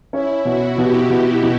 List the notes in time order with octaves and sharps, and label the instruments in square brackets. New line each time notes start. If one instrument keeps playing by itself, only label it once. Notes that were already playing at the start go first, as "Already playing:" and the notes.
[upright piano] C#4 [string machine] E4
[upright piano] B2 [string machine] F#4
[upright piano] B2 [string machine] G4
[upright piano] B2
B2